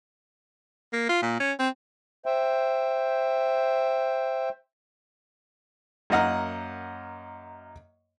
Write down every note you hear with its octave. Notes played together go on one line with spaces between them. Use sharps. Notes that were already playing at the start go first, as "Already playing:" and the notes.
A#3
F4
A#2
C#4
C4
C5 E5 G5
F#2 A#3 D#5 F#5 F6